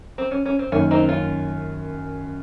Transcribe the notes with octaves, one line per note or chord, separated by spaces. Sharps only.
C4
C#4
C#4
C4
F#2 D#3 A#3 C#4
C4 D#4
C#4 F4